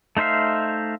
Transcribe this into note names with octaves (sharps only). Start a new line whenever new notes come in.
A3 D#4 C5 E5 F5